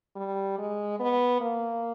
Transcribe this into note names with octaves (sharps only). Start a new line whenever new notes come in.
G3
G#3
B3
A#3